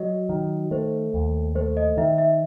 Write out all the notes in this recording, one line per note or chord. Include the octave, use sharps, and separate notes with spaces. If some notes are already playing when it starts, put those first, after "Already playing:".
Already playing: F#3 D#5
D#3
A3 C5
D#2
A3 C5
D#5
D#3 E5
E5